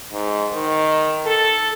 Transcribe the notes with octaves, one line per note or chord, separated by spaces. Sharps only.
G#2
D#3
A4